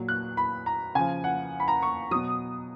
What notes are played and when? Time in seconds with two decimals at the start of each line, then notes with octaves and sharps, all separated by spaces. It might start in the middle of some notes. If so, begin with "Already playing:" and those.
Already playing: A#2 F#3
0.08 F#6
0.37 B5
0.66 A#5
0.95 C#3 F3 G#5
1.24 F#5
1.60 B5
1.68 A#5
1.82 C#6
2.11 B2 F#3 D#6